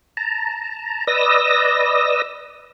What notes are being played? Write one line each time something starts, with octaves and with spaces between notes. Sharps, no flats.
A5 A#5
B4 D5 D#5 D#6 E6 A#6